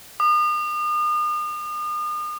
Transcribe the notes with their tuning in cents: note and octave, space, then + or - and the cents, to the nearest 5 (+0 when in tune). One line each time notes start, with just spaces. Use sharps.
D#6 -40